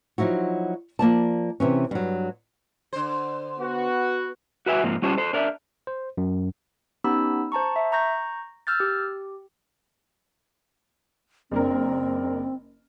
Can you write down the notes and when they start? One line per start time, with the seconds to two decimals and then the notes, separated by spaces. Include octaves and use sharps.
0.18 F3 F#3 D#4 E4 F#4
0.99 F3 A#3 D5 A5
1.60 C3 E3 C#4
1.91 G2 F#3
2.93 D3 C5
3.59 B3 F#4
4.66 F#4 B4 E5 G#5
4.84 G#2 F3 A#3 C4
5.02 G3 C#4 F4 C5 A5
5.18 A4 C5
5.33 D4 A#4 D5 E5
5.87 C5
6.17 F#2
7.04 B3 C#4 D#4 G4 B5 E6
7.52 C5 A5 A#5 C#6
7.76 E5
7.92 A#5 C#6 G6 A#6
8.67 E6 F6 G6 A6
8.80 G4
11.51 F#1 C4 D4 A#4